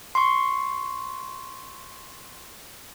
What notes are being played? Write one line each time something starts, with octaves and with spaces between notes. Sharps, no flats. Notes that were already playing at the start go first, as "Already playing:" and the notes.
C6 C#6